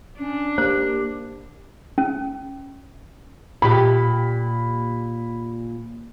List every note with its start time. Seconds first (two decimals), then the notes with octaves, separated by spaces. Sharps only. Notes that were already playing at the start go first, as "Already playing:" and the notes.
0.19 C#4 D4
0.58 A#3 G4 C5
1.98 C#4
3.62 A#2 G4 B5